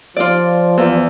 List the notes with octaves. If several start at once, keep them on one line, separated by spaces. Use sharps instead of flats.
F3 F4 D5
E2